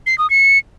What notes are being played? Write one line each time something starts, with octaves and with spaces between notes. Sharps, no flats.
C7
D#6
C#7